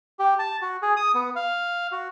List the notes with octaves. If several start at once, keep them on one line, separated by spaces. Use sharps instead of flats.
G4
A5
F#4
G#4
D#6
B3
F5
F#4